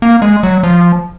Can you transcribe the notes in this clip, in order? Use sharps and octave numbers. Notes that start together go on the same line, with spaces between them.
A#3
G#3
F#3
F3